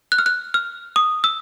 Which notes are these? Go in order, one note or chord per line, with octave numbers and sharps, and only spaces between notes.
F#6
F6
F#6
F6
D#6
E6